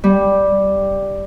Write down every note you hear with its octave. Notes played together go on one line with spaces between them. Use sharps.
G3